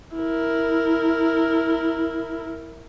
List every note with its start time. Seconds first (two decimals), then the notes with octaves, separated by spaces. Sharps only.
0.16 E4 A#4